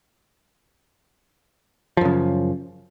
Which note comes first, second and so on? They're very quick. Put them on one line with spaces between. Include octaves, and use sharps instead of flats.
F3 F#2 C#3